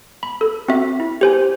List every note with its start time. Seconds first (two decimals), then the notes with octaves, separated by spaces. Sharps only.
0.23 B5
0.41 A4
0.68 C4 F#4 E5
1.00 E4
1.21 G4 C5 G#5